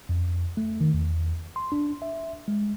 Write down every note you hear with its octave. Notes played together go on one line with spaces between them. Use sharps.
F2
A3
D#3
E2
C6
D4
E5
G#3